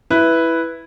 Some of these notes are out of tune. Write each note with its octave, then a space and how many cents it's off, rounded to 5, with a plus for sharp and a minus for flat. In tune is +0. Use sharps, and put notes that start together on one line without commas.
E4 +0 B4 +0